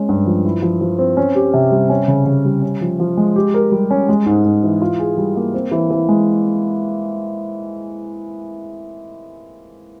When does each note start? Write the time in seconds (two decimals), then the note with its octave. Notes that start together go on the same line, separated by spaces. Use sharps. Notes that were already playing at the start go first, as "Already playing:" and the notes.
Already playing: G#3 C#4
0.09 G2
0.26 F3
0.45 E4
0.62 F3
0.81 F3
0.99 C4
1.17 C#4
1.35 G4
1.53 C3
1.72 G3
1.90 C#4
2.08 C#3
2.26 C#3
2.45 G3
2.62 C#4
2.81 F3
2.99 F3
3.17 G#3
3.36 G4
3.54 A#4
3.72 G3
3.91 C#4
4.09 G#3
4.26 G#2
4.45 G#2
4.63 E3
4.81 F4
4.99 G#4
5.17 G3
5.36 A#3
5.54 C4
5.71 E3
5.90 E3
6.09 G#3